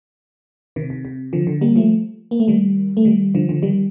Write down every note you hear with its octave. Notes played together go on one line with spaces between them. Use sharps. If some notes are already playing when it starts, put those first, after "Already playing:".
C3 D#3
C3
C3
D3 F3
D3
G3 A#3
F3 A3
A#3
A3
D#3 G3
A3
D#3 G3
D3 F3
D3 F3
D#3 G3